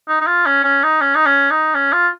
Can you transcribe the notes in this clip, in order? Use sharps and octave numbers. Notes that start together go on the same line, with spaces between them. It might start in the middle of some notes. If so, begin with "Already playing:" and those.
D#4
D#4
F4
C#4
C#4
D#4
C#4
D#4
C#4
D#4
C#4
F4